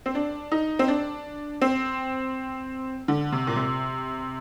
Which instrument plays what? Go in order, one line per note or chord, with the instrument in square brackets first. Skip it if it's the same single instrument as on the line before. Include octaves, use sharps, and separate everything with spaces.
[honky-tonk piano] C4
D4
D#4
C4
D4
C4
D3
C3
A#2
C3